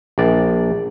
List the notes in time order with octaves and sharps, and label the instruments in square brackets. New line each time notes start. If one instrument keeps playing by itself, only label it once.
[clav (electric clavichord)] A#1 D5